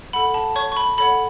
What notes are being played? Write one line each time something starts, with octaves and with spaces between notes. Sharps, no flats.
A4 F#5 B5
A5
C#5 C#6
C#6
B5
A4 C#5 F#5 B5